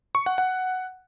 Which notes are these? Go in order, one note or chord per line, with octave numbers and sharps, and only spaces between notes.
C#6
F#5
F#5